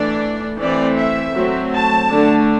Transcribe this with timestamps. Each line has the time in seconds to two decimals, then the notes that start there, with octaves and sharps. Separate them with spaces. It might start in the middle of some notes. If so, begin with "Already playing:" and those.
Already playing: E3 A3 D4 D5
0.59 E3 A3 C4 D5
0.97 E5
1.35 F#3 A3 C4
1.73 A5
2.10 D3 A3 D4